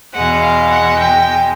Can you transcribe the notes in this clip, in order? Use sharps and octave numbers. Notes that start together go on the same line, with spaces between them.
E2 B2 G#3 F#5
F5
F#5
G5